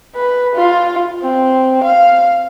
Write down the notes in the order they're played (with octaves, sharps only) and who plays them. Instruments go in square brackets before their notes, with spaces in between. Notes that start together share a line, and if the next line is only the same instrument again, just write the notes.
[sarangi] B4
F4
C4
F5